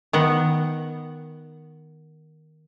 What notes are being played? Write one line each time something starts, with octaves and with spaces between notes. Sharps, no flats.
D#3 B3 F#5